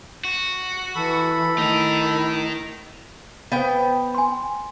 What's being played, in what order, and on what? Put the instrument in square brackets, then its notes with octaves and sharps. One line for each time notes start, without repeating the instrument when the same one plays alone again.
[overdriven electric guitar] F#4
[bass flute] E3 [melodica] A4 B5
[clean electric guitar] A2 [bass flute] D#3 [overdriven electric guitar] D#4 A#4
[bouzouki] B3 G5 [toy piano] C5 F5
[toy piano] G#5 C6